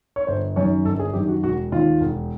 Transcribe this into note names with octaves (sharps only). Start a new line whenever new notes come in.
C#5
G1 C5
F#2 D#3 C#5
G1 A4
G#4
F#2 D#3 G4
F#4
E1 F#4
D#2 D#3 F4
E1